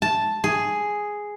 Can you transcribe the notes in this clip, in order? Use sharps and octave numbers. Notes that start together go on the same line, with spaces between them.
A5
G#4